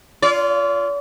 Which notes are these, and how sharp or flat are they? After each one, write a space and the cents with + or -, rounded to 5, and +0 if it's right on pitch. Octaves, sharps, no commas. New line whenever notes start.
F4 -10 D5 -45